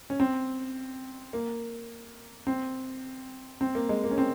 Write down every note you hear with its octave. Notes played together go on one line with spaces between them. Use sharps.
C#4
C4
A#3
C4
C4
A#3
G#3
A#3
C#4
C4